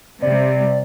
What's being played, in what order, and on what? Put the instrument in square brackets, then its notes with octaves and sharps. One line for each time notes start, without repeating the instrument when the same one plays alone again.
[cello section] C3 G3 [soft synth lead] D5